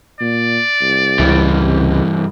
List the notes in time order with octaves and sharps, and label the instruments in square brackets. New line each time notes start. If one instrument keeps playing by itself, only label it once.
[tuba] A#2 [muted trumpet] D5
[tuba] C2
[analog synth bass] C#2 [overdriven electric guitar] G2 E3
[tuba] C3